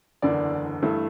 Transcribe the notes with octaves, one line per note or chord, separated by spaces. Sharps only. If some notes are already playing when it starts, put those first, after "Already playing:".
F#1 E2 D3 D5
G2 E3 A3